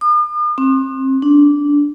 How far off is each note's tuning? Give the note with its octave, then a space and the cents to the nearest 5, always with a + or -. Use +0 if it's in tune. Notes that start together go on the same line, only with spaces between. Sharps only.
D#6 -45
C4 +30
D4 -15